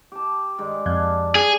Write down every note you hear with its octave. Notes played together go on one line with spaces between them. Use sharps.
G4 A5
G2 D#3 G#3
F2 D4 F5
G#4